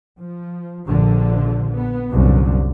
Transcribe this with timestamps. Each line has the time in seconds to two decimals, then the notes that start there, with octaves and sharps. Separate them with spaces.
0.18 F3
0.86 A#1 D3 F3
1.73 B3
2.11 C2 F#2 A#2 D3